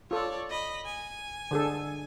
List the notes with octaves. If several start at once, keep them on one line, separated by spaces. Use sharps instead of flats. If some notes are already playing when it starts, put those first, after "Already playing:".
F4 A4 C#5 D5
D#5 B5
G#5
D3 G#4 A4